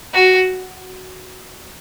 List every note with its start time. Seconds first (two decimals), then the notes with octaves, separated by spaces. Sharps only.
0.14 F#4